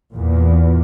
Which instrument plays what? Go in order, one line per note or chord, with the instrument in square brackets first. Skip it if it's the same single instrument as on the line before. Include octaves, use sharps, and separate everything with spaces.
[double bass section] E2 A#2